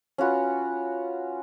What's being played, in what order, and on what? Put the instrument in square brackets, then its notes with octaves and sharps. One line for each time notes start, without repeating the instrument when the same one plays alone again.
[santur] C#4 F4 F#4 B4